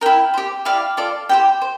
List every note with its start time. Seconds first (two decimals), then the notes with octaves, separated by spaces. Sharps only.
0.01 E4 G4 A#4 G5
0.34 G4 C5
0.65 E4 G4 D5 F5
0.97 F4 A4 D5
1.29 E4 G4 C5 G5
1.62 C5